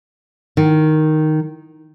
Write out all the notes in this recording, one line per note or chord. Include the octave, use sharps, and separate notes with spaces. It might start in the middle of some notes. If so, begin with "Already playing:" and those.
D#3